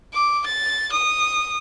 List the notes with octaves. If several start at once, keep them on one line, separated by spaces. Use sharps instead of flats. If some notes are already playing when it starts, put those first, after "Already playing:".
D6
A6
D#6